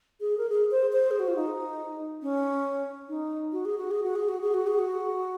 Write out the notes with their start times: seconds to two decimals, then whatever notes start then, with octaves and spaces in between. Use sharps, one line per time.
0.21 G#4
0.38 A#4
0.49 G#4
0.71 C5
0.93 C5
1.11 G#4
1.19 F#4
1.28 F4
1.36 D#4
2.22 C#4
3.09 D#4
3.53 F#4
3.65 G#4
3.78 F#4
3.91 G#4
4.03 F#4
4.16 G#4
4.29 F#4
4.41 G#4
4.54 F#4
4.67 G#4
4.79 F#4